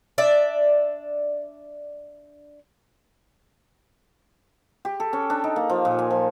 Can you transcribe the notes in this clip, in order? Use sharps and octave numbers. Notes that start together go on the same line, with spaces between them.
D4 D5 E5
G4
A4
C#4
D4
D#4
A#3
F3
A#2
G#5
F3